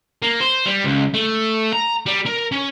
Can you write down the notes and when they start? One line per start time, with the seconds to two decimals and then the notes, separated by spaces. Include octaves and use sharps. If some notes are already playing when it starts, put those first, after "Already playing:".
0.22 A#3
0.41 C5
0.66 G3
0.84 C#2
1.14 A3
1.73 A#5
2.06 G3
2.26 A#4
2.52 C#4